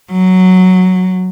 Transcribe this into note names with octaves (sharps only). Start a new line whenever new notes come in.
F#3